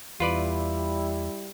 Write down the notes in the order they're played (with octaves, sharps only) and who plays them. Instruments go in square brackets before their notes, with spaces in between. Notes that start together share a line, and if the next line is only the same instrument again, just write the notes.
[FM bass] E2 [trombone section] G3 E4 [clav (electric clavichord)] F4 B4 D5